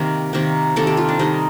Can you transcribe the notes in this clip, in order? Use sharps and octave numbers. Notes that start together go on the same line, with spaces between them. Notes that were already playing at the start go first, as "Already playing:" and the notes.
Already playing: C3 D#3 A#3 A#4
C3 D#3 A#3
C3 D#3 A#3 A4
G4
F4
D4
C3 D#3 G3 D#4